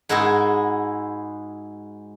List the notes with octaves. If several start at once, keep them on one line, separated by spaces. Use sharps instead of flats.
G#2 G#3 E4 F#4 G#4